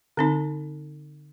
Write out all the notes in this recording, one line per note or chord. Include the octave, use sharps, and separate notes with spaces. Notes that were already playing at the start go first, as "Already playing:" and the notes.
D3 C4 D#4